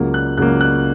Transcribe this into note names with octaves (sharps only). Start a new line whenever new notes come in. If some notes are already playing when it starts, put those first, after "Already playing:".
Already playing: C#2 C#3 F#3 A#3
F#6
C#2 C#3 F#3 A#3 F#6
F#6